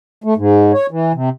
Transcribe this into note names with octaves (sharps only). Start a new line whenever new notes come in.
A3
G#2
C#5
E3
C3